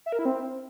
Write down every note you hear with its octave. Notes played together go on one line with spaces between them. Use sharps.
E5
A#4
E4
C4